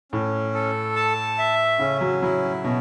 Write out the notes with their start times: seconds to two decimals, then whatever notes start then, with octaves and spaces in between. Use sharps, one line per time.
0.12 A2 C#4
0.54 A4
0.96 A5
1.38 E5
1.79 C#3 C#4
2.01 F#3
2.22 F#3 E4
2.63 B2 C#4